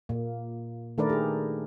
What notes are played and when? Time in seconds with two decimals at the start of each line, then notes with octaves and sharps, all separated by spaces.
0.09 A#2 A#3
0.98 D#3 A3 D4 A#4 B4 D5
1.10 G4 G#4